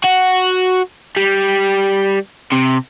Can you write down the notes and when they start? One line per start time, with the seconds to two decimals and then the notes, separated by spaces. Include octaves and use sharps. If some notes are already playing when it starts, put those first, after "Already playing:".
0.04 F#4
1.17 G3
2.52 C3